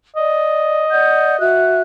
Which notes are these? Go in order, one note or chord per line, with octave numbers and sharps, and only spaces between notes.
D5 D#5
D5 F#5 G6
F#4 E5 F#6